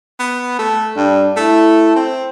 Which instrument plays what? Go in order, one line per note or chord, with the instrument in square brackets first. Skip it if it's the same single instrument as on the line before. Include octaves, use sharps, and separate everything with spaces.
[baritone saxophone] B3
A3
[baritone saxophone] G2 [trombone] D4
[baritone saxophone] A3 [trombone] E4
[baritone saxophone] C4